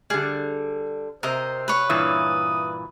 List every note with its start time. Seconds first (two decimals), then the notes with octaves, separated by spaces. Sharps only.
0.10 D3 G3 G#4
1.23 C3 A#4 C5 D#5
1.68 B4 C#5
1.90 G2 A#2 E3 D#6